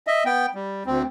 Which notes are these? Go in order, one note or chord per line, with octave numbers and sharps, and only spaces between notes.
D#5 E5
B3 G5
G3
D2 C4